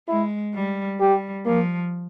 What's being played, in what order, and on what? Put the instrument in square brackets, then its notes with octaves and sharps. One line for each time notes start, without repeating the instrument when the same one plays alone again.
[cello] G#3 [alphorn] E4
[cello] G3
[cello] G3 [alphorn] G4
[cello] F3 [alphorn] A#3